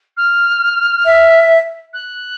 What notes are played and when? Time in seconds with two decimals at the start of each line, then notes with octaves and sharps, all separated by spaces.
0.17 F6
1.05 E5
1.93 F#6